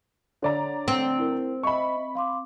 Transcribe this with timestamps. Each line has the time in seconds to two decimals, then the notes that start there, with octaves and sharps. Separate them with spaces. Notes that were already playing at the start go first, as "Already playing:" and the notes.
0.42 D3 C#5 D5 A#5
0.88 C4
1.18 E4 A#4
1.63 C5 D#5 E5 B5 C#6
2.15 F5 C6 D6